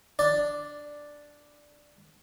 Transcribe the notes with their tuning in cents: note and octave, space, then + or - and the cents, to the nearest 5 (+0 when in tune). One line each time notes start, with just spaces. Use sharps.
D4 +0 D5 +0